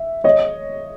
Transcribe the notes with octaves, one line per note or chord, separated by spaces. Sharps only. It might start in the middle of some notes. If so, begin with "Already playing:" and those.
Already playing: E5
C#5 D#5